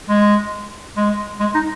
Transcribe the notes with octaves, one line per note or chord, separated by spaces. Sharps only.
G#3
G#3
G#3
D#4